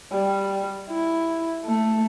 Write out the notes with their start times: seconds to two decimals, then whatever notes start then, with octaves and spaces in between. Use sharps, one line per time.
0.12 G3
0.89 E4
1.65 A3